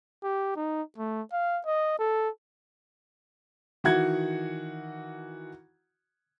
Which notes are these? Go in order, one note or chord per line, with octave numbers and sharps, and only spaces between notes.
G4
D#4
A3
F5
D#5
A4
D#3 E3 F#4 F#5 G#6